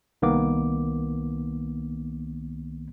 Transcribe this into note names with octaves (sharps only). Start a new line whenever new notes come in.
C2 D#3 A#3 B3 D6